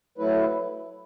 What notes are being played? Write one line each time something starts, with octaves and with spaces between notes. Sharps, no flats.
F#3 A3 E4 B4